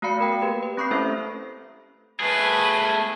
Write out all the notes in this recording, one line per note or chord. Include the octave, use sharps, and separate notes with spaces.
A3 F#4 D5 F5 B5 C#7
B3 A#4 G5
A#3 G4 B4
B4
C4 B5 C#6 D#6 G6 C7
A3 C#4 E4 A4 C5 E5
A3 G#4 B4 G#5